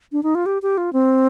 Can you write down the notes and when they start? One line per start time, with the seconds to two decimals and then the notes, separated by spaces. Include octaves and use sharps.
0.12 D4
0.23 D#4
0.35 F4
0.46 G4
0.62 G4
0.78 F4
0.93 C4